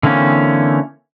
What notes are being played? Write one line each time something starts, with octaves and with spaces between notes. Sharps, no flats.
D3 E3 A#3 C4 C#4